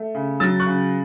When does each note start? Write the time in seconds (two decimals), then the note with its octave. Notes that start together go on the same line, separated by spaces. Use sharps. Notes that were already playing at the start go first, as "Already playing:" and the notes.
Already playing: A3
0.15 C#3
0.40 F#3 E6 A6
0.60 C#6 F#6
0.66 C#3